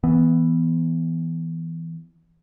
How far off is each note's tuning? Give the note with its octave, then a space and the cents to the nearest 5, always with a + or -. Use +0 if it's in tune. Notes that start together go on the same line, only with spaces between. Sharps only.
E3 +0 B3 +0